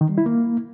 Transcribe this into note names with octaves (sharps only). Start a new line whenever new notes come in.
D#3
G3
E4
A#3